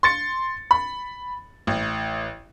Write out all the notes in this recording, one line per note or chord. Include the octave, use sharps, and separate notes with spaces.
C6 A6 C#7
B5
A1